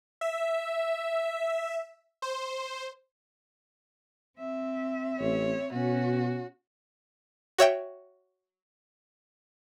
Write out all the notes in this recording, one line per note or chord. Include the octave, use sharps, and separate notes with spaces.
E5
C5
C4 E5
A1 C#5
B2 C#4 F#4
F#4 C#5 E5 G5